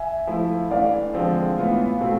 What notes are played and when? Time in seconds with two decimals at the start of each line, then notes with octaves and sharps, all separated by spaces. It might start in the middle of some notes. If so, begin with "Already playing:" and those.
Already playing: E5 G#5
0.27 F3 A3 E4
0.71 E3 A3 D4 D5 F5
1.14 D3 F3 G#3 C4
1.57 A2 E3 B3 F4
2.00 B2 A3 C4 F4